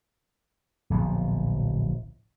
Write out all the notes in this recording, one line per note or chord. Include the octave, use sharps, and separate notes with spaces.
D1 A#1 F3 B3